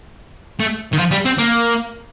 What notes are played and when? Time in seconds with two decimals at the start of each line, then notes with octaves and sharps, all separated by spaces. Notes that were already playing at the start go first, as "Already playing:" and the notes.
0.59 A3
0.93 D#3
0.98 F3
1.11 G3
1.25 C4
1.38 A#3